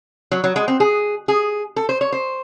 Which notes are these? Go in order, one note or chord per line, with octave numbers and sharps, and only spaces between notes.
F#3
F#3
G#3
C4
G#4
G#4
A4
C5
C#5
C5